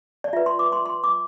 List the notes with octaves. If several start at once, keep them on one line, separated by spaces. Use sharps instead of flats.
D5
F4 B4 E5
C6
D6
C6
C6
D6